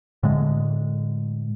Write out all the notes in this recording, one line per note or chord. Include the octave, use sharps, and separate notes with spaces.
A2 D3 G#3